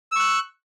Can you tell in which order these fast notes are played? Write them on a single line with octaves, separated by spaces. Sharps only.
E6 C#6 F#6